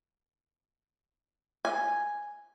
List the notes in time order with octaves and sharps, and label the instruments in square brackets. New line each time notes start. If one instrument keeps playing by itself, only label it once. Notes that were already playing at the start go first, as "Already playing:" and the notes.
[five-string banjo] G#5